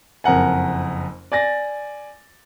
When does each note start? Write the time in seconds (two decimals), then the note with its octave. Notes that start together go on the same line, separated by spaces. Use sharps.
0.24 F#1 F2 A#4 F#5 G#5
1.32 D5 G#5 A6 A#6